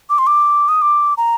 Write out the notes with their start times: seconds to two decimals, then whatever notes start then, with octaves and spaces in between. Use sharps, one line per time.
0.10 D6
0.18 C6
0.27 D6
0.68 D#6
0.82 D6
1.17 A#5